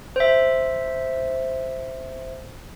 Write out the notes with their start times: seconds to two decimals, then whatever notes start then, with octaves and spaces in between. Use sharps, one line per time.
0.16 C5 E5